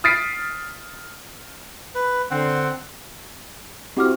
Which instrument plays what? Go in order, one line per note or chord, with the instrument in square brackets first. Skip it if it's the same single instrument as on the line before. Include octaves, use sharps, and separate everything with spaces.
[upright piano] D#6 F6 A6 B6 C7 D7
[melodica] B4
[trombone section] D3 [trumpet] C4 [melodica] F#5
[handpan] C4 E4 F#4 [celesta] G4 D6 F6